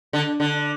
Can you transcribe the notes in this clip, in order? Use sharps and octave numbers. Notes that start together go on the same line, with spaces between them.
D3
D3